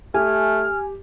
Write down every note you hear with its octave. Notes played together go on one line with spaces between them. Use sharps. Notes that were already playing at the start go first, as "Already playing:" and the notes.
A3 G4 G#5 F6